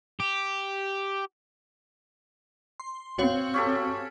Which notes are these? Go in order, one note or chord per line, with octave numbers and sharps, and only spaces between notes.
G4
C6
C4 F#4 C#5 F5
C#4 G4 A4